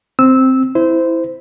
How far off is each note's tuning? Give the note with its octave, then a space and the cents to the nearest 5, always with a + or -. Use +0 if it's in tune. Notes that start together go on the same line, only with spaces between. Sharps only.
C4 +0 E6 -15
E4 -5 C5 -20